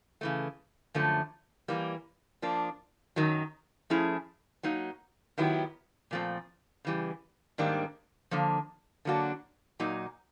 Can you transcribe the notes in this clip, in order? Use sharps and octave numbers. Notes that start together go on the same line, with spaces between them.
C#3 E3 A3
F#2 D3 F3 A3
E3 G3 A#3
F3 A#3 D4
F#2 D#3 F#3
F3 A3 C#4 E4 G#4
F#3 A#3 D#4
D#3 F#3 B3 E4 G4
A#2 F3 A3 C4
C#3 E3 G3
G#2 D#3 G3 A#3 D4
D3 F3 A#3
D3 F#3 A#3 D4 F#4
A#2 F#3 A#3 D#4